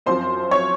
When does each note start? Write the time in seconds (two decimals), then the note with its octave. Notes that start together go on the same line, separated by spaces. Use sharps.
0.06 F#2 F3 C4 C5 C6
0.51 C#5 C#6